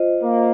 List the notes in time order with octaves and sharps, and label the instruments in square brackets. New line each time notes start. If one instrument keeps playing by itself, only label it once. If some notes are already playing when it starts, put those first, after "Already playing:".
Already playing: [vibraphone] F4 C5 D#5
[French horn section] A#3